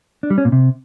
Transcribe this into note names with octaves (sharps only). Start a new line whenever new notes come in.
D4
G3
C#4
A#2
C3